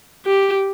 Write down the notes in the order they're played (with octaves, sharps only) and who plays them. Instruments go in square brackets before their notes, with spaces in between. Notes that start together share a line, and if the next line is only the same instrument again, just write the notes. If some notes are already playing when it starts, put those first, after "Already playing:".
[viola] G4